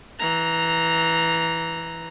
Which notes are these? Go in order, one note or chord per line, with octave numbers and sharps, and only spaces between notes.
E3 A#5